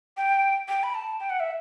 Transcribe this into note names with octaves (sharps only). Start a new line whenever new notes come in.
G5
G5
B5
A5
G5
F#5
E5